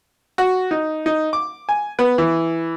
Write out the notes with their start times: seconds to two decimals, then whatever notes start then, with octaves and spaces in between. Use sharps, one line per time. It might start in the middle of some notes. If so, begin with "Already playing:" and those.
0.38 F#4
0.71 D#4
1.06 D#4
1.33 D6
1.69 G#5
1.99 B3
2.18 E3